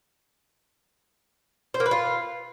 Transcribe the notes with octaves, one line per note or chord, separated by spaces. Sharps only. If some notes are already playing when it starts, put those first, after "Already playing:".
C5
A#3
B4
F4